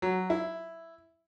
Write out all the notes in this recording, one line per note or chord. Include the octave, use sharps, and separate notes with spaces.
F#3
E4